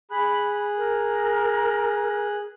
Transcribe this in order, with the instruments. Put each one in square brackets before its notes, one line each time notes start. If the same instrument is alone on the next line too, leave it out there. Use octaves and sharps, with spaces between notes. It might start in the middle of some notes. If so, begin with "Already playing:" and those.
[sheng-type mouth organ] G#4 F#6 [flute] B5
[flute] A#4